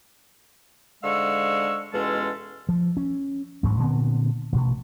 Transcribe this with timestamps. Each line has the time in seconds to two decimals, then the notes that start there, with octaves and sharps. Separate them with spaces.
1.04 G#2 D3 G#3 F5 C#6 E6
1.93 E2 B2 G#3 C#4 F4 A4
2.69 F3
2.97 C#4
3.63 A1 D2 G#2 F#3
3.79 A#2 D3 B3 C4
4.52 A1 B2